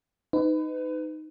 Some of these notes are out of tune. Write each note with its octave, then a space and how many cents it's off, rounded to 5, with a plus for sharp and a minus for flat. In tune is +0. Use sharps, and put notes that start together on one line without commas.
D#4 +0 B4 +30